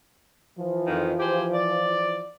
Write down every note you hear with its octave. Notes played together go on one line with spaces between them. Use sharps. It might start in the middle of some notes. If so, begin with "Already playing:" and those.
E3 F3
F2 D#3
G4 G#4 C5
D5